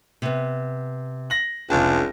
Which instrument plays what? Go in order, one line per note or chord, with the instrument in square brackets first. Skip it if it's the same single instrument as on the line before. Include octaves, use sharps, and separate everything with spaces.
[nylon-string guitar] C3 B3
[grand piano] A#6 F#7
[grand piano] F1 G#4 A5 [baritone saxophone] C#2 [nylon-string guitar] D4 F5